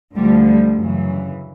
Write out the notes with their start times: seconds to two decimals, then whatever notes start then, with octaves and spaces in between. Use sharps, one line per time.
0.14 D2 D3 F3 G3
0.46 G3
0.77 F#2 C#3 E3